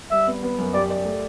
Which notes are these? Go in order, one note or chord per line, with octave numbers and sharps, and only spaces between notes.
G3 E5
B3
B3
F#2
G4 D5
D5
A3